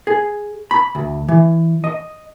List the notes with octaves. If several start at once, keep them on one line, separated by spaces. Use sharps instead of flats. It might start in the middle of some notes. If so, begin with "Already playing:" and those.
G#4
B5
D2
E3
D#5